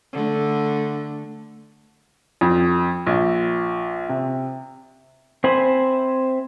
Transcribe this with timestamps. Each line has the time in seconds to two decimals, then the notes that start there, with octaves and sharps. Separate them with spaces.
0.13 D3 A3
2.41 F2
3.06 A#1
4.09 C3
5.44 C4 C5 E5 G#5 B5